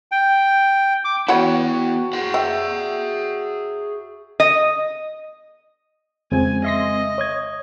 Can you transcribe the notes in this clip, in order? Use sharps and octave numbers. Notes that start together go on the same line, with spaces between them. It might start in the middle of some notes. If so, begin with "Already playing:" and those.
G5
D6
E3 B3 E4 F#4 C#5 F#5 G5 B5
G#4 F#5
E5 G5
D#5
F2 C#3 G#3 C4 G#5
D#5 E5 C6 A#6
C#5 D#6 G#6